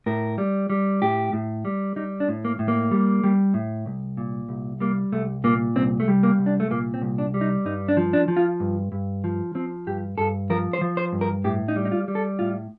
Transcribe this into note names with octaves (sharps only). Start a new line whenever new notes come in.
A2 A#4
G3
G3
A2 G4
A2
G3
G3 D#4
D4
A2
A#3
A2
A#3
G3
G3
A2
C2
A#2
C2
G3 A#3
C2 A3
A#2 A#3
C2 C4
A3
G3
A#3
C2
D4
A3
A#2 A#3
C4
C2
D4
G3
D#4
G2 D#4
D4
F3
D4
F3
F4
G2
G2
F3
F3 C4
G2 G4
G2 A4
F3 A#4
C5
F3
C5
G2
A#4
A2 G4
D#4
G3
D#4
F4
G3
A4
A2 F4